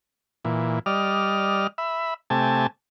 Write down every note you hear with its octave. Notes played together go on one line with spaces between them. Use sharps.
A#2 E3
G3 D5 D#5 F6
E5 B5
C3 A3 G4 G#5 A5